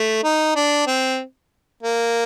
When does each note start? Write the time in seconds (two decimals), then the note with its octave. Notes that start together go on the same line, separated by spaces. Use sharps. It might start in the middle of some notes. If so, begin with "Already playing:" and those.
Already playing: A3
0.23 D#4
0.56 D4
0.87 C4
1.83 A#3